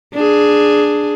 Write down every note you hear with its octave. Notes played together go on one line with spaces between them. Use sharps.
D4 G#4